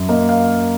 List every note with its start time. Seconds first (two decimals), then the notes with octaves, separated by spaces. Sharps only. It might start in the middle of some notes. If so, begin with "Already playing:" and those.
Already playing: F#2
0.09 A#3 D#5
0.29 F5